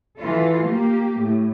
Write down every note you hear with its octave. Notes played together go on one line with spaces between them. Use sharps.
E3 F4 A4
A#3 G4
A2